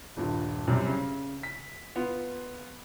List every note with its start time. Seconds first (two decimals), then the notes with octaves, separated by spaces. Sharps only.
0.17 D#1 G2 F4
0.67 F#2 C3 G3
0.88 C#3
1.43 B6
1.96 B3 F4